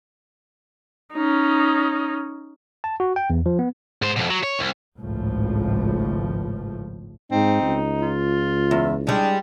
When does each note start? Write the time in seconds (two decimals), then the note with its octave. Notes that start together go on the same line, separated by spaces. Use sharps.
1.14 C#4 D#4
2.84 A5
3.00 F#4
3.16 G5
3.30 E2
3.46 F3
3.59 B3
4.02 G#2 C5
4.17 F2 B2
4.30 F#3
4.44 C#5
4.59 C2
4.98 G#1 C#2 A2 F3
7.32 G#2 C4 D#4
7.62 C#2
8.02 F4
8.71 E2 E5
9.07 G3 G#3 D4